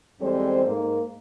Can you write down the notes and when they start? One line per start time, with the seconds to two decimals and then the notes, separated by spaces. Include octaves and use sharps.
0.21 E2 G3 G#3 C4 A4 C5
0.66 G#2 A#3